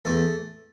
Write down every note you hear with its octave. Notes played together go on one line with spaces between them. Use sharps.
E2 A3 A4